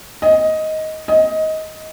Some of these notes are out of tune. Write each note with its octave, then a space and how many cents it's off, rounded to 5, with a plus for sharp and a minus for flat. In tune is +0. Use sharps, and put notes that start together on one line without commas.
D#5 +10
D#5 +15